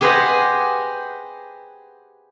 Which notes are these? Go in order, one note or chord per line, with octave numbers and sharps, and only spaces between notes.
G4 G#4 B4 C5 D#5 F#5